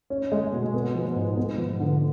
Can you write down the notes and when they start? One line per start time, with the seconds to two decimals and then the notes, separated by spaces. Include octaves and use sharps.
0.10 C#4
0.32 G#3
0.52 B2
0.74 B3
0.95 F3
1.16 G#2
1.37 B3
1.58 F3
1.80 D3